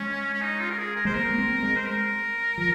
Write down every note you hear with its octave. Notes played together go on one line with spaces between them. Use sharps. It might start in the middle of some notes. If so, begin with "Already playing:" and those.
Already playing: G#3 C#4
C#4
D#4
F4
A#4
G#4
A#4
G#3 C5
A#3 A#4
A#3
C4
G#3
C5
A#4
F3